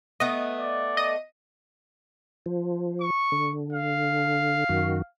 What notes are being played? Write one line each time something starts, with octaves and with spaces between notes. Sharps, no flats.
A3 B3 D#5
D5
D#5 D#7
F3
C#6
D3
F5
F#2 D#3 F#4